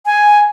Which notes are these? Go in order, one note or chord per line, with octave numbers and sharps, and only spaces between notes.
G#5